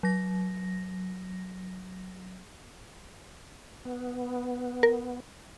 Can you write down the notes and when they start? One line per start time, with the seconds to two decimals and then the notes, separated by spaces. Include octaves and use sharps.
0.03 F#3 A#6
3.85 B3
4.83 A#4